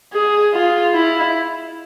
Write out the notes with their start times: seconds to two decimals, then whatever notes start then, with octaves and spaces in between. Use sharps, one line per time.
0.13 G#4
0.54 F4
0.94 E4